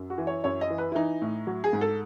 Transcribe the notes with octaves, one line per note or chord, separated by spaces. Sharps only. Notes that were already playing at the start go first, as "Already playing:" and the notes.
Already playing: F#2
F#4
E3
C#5
F#2 C#5
D#5
E3
B4
E4
E3 D#4
A2
F#3
G#4
G#2
A4